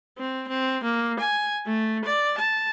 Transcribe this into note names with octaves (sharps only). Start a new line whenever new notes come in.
C4
C4
A#3
G#5
A3
D5
A5